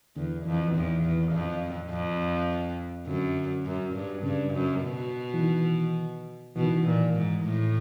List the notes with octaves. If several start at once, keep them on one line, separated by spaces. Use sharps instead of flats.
E2 D3
F2 E3
E3
E2 D#3
E2
F2
F2
F#2 D3
F#2
G2
G2 C#3
F#2
B2
E3
D#3
B2 E3
D#3
E3
A#2
G#2
A2